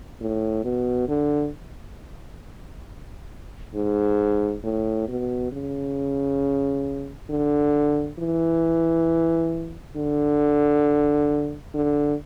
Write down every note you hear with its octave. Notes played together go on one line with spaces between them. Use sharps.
A2
B2
D3
G#2
A2
B2
C#3
D3
E3
D3
D3